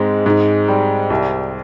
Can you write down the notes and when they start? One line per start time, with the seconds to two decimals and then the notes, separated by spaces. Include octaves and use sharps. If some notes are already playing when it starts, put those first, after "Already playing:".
Already playing: G#2 G#3 C4
0.26 G#2
0.68 G3
1.10 C2